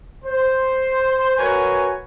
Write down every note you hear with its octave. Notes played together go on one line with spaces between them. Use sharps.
C5
F#4 A#4 B4 C#5 G#5